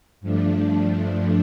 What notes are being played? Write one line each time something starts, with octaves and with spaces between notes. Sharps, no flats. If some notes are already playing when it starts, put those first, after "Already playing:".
G2 F3 A3 D4